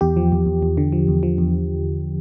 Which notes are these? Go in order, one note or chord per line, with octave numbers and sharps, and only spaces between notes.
E2 G4
F3
E2
E2
E2
D3
F3
E2
F3
E2